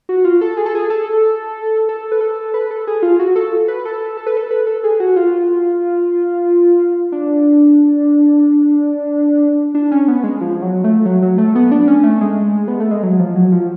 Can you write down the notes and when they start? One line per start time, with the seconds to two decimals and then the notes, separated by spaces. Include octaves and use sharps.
0.09 F#4
0.24 F4
0.41 A4
0.57 G#4
0.66 A4
0.75 G#4
0.90 A4
1.89 A4
2.12 B4
2.21 A4
2.54 B4
2.71 A4
2.87 G#4
3.03 F4
3.19 F#4
3.36 A4
3.68 B4
3.85 A4
4.17 A4
4.27 B4
4.37 A4
4.51 B4
4.67 A4
4.84 G#4
5.00 F#4
5.16 F4
7.12 D4
9.74 D4
9.91 C#4
10.08 B3
10.23 G#3
10.41 F3
10.62 F#3
10.84 A3
11.05 F#3
11.22 F#3
11.38 A3
11.55 B3
11.72 D4
11.88 C#4
12.04 A3
12.21 G#3
12.68 B3
12.80 A3
12.91 G#3
13.03 F#3
13.19 F3
13.35 F#3
13.52 F3